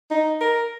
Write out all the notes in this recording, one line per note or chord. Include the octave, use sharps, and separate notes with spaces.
D#4
A#4